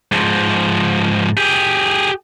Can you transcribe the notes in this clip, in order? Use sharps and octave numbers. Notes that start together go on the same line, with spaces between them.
G#2 F3
G4 G#4